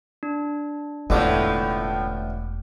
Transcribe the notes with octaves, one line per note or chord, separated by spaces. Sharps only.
D4
E1 A1 A2 D3 F3 A3 C#4 D6